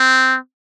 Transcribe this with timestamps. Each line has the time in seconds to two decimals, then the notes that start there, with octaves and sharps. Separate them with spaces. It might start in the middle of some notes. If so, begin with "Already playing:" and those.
Already playing: C4